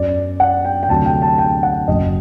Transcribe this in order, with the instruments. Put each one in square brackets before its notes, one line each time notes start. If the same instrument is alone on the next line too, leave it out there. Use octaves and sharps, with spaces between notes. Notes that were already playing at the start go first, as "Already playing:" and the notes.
Already playing: [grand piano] F#2 F#3 D5
F#5
G5
G5
D2 C3 F#3 A5
G5
A5
G5
F#5
F#1 F#2 F#3 D#5